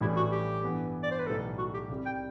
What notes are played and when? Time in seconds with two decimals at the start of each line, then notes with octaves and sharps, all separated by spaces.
0.01 A1 A2 E3 G3 D4 E4
0.17 F#4
0.32 G4
0.63 G2 E3 B3
1.03 D5
1.11 C5
1.19 B4
1.27 B1 A2 E3 G3 A4
1.59 F#4
1.74 G4
1.89 C2 C3 G3
2.06 G5